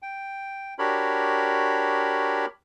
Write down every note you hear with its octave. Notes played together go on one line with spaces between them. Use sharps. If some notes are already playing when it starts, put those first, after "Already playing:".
G5
D4 F#4 G4 A#4 C#5 B5